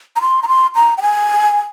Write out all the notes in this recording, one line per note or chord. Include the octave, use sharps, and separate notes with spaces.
A#5
C6
A#5
C6
A#5
G5
G#5